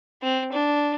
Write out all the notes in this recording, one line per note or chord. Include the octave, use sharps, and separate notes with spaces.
C4
D4